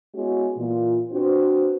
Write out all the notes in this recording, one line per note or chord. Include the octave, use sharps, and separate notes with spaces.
G#3 B3 C#4 E4 F#4
A#2 E3 F4
C4 D4 F#4 B4 C5